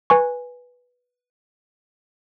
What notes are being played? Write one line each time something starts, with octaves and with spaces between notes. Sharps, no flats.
B4 G#5 C#6